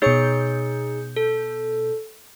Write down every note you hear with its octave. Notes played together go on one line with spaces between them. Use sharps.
B2 D#4 G#4 C#5 G6 C#7
A4